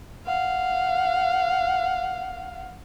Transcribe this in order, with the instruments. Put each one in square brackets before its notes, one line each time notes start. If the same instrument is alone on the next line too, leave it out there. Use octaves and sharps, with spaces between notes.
[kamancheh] F5 F#5